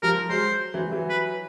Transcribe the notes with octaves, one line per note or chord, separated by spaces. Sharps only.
F3 G3 A#4
F#3 G#3 C5
E3 F#3
G3
E3 F#3
B4